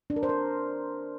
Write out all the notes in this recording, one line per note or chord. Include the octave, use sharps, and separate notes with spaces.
D4
A#4
C5
A#4